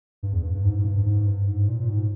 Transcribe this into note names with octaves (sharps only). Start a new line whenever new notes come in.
G2
E2
G2
G2
G#2
G#2
G2
G2
G#2
G2
G#2
A#2
A#2
G#2